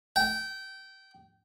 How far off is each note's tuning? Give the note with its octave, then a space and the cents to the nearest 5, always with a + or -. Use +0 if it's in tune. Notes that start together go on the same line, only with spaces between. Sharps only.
G5 -25